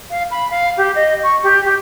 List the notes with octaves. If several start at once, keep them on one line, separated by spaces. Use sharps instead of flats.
F5
B5
F5
G4
D#5
C#6
G4
G4